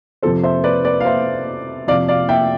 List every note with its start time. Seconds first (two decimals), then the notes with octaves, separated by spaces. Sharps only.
0.22 F2 C3 F3 A4 C5
0.43 C5 E5
0.64 B4 D5
0.85 B4 D5
1.01 F5
1.05 C5 E5
1.87 F2 C3 F3 D5 F5
2.08 D5 F5
2.29 E5 G5